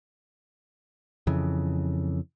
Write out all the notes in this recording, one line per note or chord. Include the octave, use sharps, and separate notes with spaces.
F2 C#3 E3